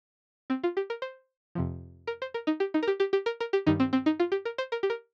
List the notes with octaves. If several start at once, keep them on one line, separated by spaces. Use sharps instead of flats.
C4
F4
G4
A#4
C5
F2 C3 F3
A#4
C5
A#4
D#4
G4
D#4
A#4
G4
G4
G4
A#4
A#4
G4
G2 D#3 G3 D#4
C4
C4
D#4
F4
G4
A#4
C5
A#4
G4
A#4